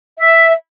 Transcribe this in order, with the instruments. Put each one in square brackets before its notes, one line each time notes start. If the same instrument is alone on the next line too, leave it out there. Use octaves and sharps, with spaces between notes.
[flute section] E5